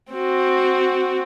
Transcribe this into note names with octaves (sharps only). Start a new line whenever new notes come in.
C4 F#4